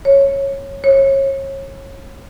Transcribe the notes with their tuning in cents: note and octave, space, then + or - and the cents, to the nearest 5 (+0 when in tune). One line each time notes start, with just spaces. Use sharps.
C#5 -10
C#5 -30